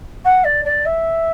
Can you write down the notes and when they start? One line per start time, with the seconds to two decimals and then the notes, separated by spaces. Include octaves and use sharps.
0.24 F#5
0.44 D5
0.64 D5
0.85 E5